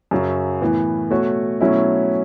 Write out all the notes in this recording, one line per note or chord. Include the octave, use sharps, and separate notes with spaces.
F#2 C#3 F#3
A2 E3 B3
B2 A3 F#4 A4 C#5
B2 F#3 A3 C#4 E4